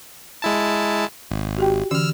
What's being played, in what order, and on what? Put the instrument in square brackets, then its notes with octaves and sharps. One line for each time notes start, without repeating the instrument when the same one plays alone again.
[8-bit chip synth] G#3 E4 A5
G#1
[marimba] F#4 G4 G5
[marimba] D3 E3 C#4 [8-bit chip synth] E6 F6